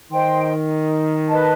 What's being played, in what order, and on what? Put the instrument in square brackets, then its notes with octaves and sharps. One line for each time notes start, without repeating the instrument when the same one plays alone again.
[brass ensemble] D#3 [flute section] C5 D#5 G5 C6
[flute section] B4 D#5 A5